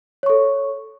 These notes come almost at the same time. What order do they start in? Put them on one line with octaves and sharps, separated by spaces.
C#5 C#6 A4